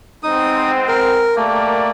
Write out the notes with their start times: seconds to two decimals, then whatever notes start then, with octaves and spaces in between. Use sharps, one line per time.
0.23 G#3 B3 C4 D#4 D#6
0.88 A#4
1.36 A3 A#3 G4 A#4 D5